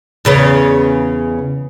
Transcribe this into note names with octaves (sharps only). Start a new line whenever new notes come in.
E2 C#3 B3